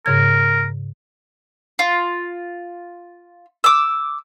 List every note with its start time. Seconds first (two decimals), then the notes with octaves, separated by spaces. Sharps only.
0.06 G#2 C#3 A#4 G#6
1.79 F4
3.64 D6 E6